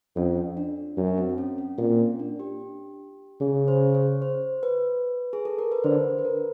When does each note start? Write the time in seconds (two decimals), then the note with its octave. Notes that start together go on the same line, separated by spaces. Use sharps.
0.16 F2 C#4
0.57 D4
0.97 F#2 C#4
1.18 C4
1.29 C4
1.38 C#4
1.58 C#4
1.78 A#2 C4
1.99 C#4
2.19 D4
2.39 G4
3.41 C#3 G#4
3.68 C5
3.95 C#5
4.22 C5
4.63 B4
5.33 G#4
5.45 A4
5.59 A#4
5.72 B4
5.84 D3 C5
6.19 B4
6.25 A#4